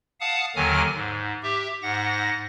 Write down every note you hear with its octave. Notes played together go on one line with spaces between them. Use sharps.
F5 F#5 A5 D#6
D#2 D3 D#3 F#3 G#5 F6
G#2
G4 E5
G#2 F#5 A#6